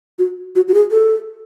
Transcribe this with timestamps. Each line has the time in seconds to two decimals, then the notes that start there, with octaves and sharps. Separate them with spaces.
0.19 F#4
0.56 F#4
0.68 F#4
0.74 G#4
0.91 A4